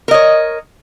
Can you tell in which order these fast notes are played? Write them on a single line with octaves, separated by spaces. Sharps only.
A#4 D#5 C#5